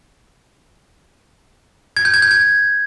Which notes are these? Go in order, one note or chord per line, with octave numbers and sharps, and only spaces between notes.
G#6
G6
G#6
G6
G#6